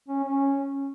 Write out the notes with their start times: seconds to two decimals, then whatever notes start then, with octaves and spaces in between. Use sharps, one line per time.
0.08 C#4
0.25 C#4